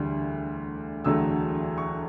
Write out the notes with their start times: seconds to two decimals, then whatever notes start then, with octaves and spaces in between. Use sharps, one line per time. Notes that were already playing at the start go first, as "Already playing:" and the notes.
Already playing: E1 D2 D3 G3
1.04 E1 D2 D3 F#3 A3 E6
1.78 C#6